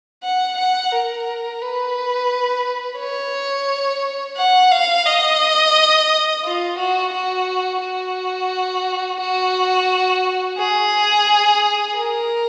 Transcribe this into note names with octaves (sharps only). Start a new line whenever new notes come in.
F#5
F#5
A#4
B4
C#5
F#5
F5
D#5
F4
F#4
F#4
F#4
F#4
G#4
A#4